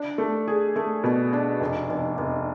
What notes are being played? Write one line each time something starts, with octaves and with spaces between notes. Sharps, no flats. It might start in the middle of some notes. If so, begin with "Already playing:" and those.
Already playing: D4
A3
G#4
A3
B2
D4
F1
F1
F1